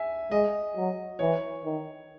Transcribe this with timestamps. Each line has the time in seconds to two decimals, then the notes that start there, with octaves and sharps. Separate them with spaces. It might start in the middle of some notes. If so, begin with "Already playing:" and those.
Already playing: E5 G#5
0.31 G#3 D#5
0.76 F#3
1.19 E3 C#5
1.64 D#3